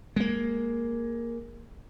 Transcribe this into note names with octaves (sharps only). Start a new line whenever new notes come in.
G#3 A#3